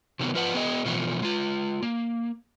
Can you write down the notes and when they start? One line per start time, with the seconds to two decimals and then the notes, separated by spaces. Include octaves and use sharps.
0.19 C3 D#3 F#3 B3
0.34 F3 F4 B4 F#5
0.55 B3 F#4 G#4 D#5
0.85 B2 E3 F3 A3 B3
1.22 G#3 F4
1.82 A#3